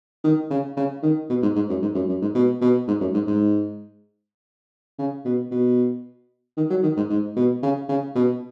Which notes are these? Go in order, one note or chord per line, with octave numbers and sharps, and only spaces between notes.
D#3
C#3
C#3
D#3
B2
G#2
G#2
F#2
G#2
F#2
F#2
G#2
B2
B2
G#2
F#2
G#2
G#2
C#3
B2
B2
D#3
F#3
D#3
G#2
G#2
B2
C#3
C#3
B2